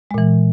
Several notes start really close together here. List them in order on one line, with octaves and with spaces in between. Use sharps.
G#3 A#2 E3